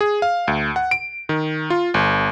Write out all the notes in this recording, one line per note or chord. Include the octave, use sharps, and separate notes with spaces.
G#4
F5
D2
F#5
D7
D#3
F4
G1